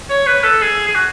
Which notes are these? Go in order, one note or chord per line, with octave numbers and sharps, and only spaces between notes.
C#5
B4
A4
G#4
G#4
F#4